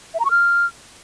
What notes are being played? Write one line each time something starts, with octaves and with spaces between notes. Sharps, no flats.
E5
A#5
C#6
F6